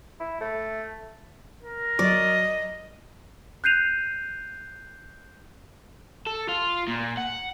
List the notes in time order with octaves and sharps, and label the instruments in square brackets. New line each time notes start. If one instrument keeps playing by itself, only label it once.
[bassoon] E4
A3
[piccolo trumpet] A#4
[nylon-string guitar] F#3 [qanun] D5 [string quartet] D#5
[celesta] F#6 G6 C7 D#7 F7
[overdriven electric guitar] A4
F4
A#2
F#5